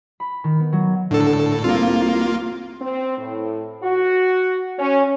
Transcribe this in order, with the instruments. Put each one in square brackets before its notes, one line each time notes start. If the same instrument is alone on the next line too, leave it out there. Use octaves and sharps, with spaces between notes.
[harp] B5
D#3
B3
F#3
[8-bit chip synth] A2 A4 [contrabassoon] D3
[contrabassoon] C2 [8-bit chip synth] A#3 F4
[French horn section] C4
A2
F#4
C#4